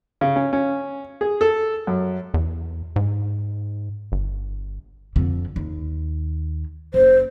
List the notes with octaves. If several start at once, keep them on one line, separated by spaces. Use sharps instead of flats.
C#3
C#4
C#4
G#4
A4
F#2
E2
G#2
G1
F2 D3
D#2
F#1 C5